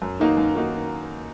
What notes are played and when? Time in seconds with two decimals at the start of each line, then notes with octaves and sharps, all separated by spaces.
0.02 F#2
0.20 D#3 A#3 D#4 F#4
0.37 F#2
0.55 D#3 A#3 D#4 F#4